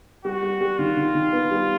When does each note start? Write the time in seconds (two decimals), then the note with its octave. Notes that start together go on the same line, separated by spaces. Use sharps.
0.24 G3 F#4
0.43 G3
0.61 G3
0.79 D#3 F4
0.97 D#3
1.15 D#3
1.33 B3
1.51 G3